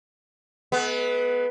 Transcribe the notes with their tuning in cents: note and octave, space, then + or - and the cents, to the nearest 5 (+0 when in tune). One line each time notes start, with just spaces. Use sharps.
G#3 +45 B3 +0